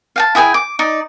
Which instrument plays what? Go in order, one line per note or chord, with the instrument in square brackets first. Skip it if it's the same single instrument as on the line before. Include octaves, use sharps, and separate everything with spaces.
[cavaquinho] F5 G5 A5
E4 G#4 G5 G#5
D6
D#4 D5